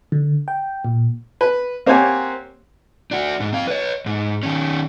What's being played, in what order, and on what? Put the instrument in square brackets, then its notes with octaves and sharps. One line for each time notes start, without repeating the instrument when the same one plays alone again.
[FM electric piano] D3
G5
A#2
[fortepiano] B4
A#3 C4 G4 C#5 F#5 G#5
[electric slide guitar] D4 F#4
G#2
C4 F5
B4 C#5
G#2
D#3 C#4